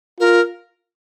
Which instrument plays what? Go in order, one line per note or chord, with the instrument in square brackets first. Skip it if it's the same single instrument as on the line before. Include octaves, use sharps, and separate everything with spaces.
[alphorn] F4 [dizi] A#4